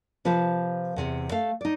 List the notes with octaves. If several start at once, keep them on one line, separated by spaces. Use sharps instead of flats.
C3 F3 B4 C5 F5
E2 C3
A3 A4 F5
D#4 D5